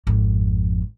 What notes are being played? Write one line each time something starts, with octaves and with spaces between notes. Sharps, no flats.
G#1 F2